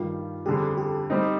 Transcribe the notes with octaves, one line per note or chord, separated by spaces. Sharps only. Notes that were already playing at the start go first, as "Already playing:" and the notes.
Already playing: G2 D#3 G3 F4
F2 D3 G3 D4 G4 G#4
G4
G3 C4 D#4